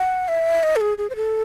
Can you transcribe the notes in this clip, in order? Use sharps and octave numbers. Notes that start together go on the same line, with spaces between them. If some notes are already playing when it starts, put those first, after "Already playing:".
Already playing: F#5
E5
D#5
A4
G#4
G#4
C5
A4